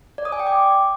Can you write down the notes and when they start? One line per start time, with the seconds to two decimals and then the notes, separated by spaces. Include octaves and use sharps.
0.18 D5
0.25 D#6
0.32 G#5
0.40 G5
0.47 D6